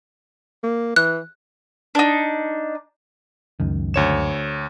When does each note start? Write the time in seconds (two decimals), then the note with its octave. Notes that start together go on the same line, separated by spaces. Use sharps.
0.64 A#3
0.96 E3 F#6
1.95 D4 D#4
3.60 C#2 F#2 D#3
3.94 D2 C#5 E7